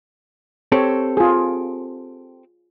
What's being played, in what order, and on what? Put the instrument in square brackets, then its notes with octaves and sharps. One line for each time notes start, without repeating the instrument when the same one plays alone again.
[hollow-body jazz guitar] C4 G4 A4 [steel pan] C#5
[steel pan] F4 G#4